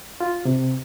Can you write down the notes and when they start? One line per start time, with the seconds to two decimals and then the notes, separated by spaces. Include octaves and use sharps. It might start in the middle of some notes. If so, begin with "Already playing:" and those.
0.20 F4
0.45 C3